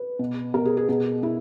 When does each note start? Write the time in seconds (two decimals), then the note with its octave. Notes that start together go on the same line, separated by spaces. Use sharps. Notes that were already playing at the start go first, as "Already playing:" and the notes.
Already playing: B4
0.19 B2
0.54 B2 A#4
0.65 G#4
0.77 G#4
0.88 B2 G#4
1.23 B2 E4